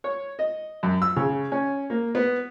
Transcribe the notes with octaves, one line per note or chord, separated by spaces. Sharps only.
C#5
D#5
F#2
E6
C#3
C#4
A#3
B3